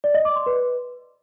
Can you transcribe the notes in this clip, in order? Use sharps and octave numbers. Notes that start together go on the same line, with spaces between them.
D5
D#5
D6
C6
B4